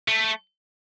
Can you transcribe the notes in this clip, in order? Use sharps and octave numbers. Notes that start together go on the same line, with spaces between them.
A3